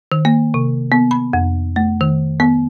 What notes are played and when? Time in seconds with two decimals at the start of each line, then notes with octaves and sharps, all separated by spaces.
0.12 D#3
0.25 A#3
0.54 C3
0.92 B3
1.11 B5
1.33 F2
1.76 A3
2.01 D#3
2.40 B3